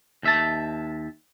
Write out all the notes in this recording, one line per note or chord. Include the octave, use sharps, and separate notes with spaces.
D#2 E5 A5